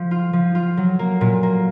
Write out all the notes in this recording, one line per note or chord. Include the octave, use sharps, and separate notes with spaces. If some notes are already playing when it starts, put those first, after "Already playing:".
Already playing: F3
F4
F3
F4
F#3
A#3
A#2
A#3